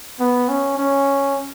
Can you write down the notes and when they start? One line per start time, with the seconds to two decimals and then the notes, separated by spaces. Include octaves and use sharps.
0.20 B3
0.49 C#4
0.77 C#4